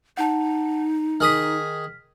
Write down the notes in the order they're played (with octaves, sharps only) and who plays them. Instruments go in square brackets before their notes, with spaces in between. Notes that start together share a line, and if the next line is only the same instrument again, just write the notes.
[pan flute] D#4 [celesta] F#5 A5
[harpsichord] D#3 G#4 D#6 [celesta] F6 B6